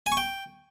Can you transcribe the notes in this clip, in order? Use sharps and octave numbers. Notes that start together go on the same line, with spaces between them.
G#5
C#6
G5